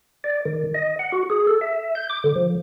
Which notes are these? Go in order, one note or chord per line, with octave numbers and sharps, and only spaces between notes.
D5
D#3
D#5
F#5
F#4
G#4
A4
E5
G6
D6
D3
F3